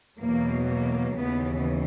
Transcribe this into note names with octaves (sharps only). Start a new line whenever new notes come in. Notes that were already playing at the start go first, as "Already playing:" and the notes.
E2 B2 F#3 A#3
A#3
D#2 C#3 E3 B3